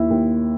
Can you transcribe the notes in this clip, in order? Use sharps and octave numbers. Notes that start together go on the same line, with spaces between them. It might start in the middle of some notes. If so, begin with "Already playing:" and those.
Already playing: D#2 E4
D#2